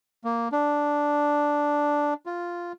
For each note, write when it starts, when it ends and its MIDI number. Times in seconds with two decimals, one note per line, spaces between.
0.24 0.48 58
0.52 2.14 62
2.26 2.72 65